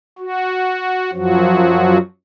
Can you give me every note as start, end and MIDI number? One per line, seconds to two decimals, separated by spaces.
0.19 1.11 66
1.13 1.98 42
1.13 1.98 53
1.13 1.98 54
1.13 1.98 66